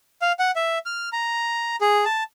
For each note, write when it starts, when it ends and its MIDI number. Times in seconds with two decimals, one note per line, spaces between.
0.22 0.32 77
0.39 0.51 78
0.56 0.78 76
0.86 1.09 89
1.13 1.76 82
1.81 2.05 68
2.05 2.23 81